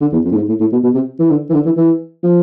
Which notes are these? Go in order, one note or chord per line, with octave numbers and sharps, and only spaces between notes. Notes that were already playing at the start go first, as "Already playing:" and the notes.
D3
E2
F2
A2
G#2
A2
A2
B2
B2
C3
E3
D3
E3
D3
E3
E3
F3